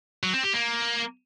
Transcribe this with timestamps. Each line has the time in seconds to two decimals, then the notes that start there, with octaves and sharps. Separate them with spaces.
0.23 F#3
0.33 C4
0.43 G4
0.53 A#3